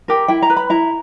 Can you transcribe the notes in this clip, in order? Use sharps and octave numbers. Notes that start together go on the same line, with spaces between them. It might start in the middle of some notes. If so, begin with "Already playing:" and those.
G4 A#4
E4 G5
A#5
B4
B5
E4 A#5